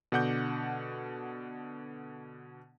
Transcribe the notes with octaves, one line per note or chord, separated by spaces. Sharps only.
B2 D3 D4 F#5 D6 G6